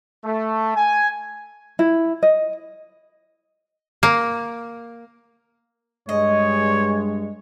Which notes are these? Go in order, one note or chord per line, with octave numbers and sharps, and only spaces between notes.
A3
G#5
E4
D#5
A#3
G2 G#3 C#5 D#5